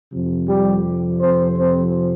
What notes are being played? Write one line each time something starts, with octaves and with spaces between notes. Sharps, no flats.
F2 C3 F3
G3 G4
C4 C5
C4 C5